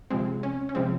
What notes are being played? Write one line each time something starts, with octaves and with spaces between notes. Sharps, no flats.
C3 F3 G#3 C4
C#4
C#4
C3 F3 G#3 C4